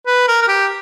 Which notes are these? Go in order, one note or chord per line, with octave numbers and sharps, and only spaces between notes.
B4
A#4
A#4
G4